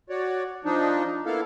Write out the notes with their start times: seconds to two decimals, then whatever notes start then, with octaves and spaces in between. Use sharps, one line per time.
0.10 F#4 C#5 D5
0.65 F3 D4 D#4
1.26 A#3 B3 E4 A4 F5